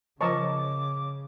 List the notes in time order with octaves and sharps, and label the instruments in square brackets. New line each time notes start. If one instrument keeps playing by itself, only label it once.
[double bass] C#3 [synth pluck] F3 A#4 C#5 [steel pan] D#5 A5 C#6 [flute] D6